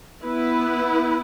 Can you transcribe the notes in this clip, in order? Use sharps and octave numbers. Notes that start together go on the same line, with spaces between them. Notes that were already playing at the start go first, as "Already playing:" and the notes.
B3 E4 B4